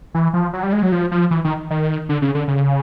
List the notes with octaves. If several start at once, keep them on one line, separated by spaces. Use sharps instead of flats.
E3
F3
F#3
G3
G#3
F#3
F3
F3
E3
D#3
D#3
D3
C#3
D3
C#3